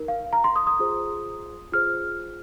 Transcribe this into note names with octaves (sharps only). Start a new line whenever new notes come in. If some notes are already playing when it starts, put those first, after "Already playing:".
Already playing: D#4 A#4
F5
A#5
C6
D#6
D#6
F4 G#4 C5
F4 G#4 C5 F6